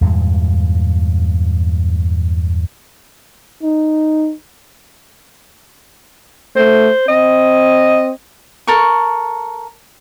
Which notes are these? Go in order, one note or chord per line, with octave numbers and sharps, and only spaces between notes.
E2 G2 A#2 G#3
D#4
A3 C5
C4 D#5
A4 A#4 C#6